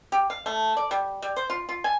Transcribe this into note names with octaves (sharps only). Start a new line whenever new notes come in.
G4
F5
A3
D5
G3
G3
C5
F4
F4
G#5